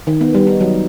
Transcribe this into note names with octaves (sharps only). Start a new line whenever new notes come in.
D#3
B3
G3
D#4
F#3